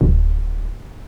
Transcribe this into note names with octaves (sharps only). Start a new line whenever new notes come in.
D1